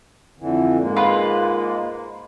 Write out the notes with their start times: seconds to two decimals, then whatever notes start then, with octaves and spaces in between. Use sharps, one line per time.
0.39 F2 D3 E3
0.81 G#2 G#3 A#3
0.96 F4 B4